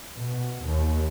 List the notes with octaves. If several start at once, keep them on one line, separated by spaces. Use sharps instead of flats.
B2
D#2